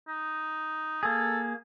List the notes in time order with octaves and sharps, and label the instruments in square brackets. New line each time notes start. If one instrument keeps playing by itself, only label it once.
[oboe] D#4
[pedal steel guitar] A#3 G#4 [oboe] A4